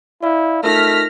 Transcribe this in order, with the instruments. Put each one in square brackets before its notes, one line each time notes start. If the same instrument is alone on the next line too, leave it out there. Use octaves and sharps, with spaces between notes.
[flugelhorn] E4 [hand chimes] D5 F5
[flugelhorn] A3 [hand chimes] D#4 F4 A#4 [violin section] F6 A#6 B6